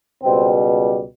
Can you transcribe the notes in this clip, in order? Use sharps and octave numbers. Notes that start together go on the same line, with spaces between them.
C#2 B2 G3 C4